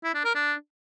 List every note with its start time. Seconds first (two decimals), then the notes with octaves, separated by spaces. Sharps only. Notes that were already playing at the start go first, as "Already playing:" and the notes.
0.04 E4
0.14 D4
0.25 A#4
0.35 D4